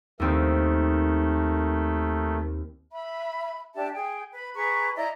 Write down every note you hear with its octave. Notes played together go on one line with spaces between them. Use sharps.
D#2 D#3 A3 C4 A4
E5 B5
D4 G4 E5 A5
G#4 G5
B4 B5
G#4 B4 A#5 C#6
E4 D5 D#5 A#5